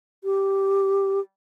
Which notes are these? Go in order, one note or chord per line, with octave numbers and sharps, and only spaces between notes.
G4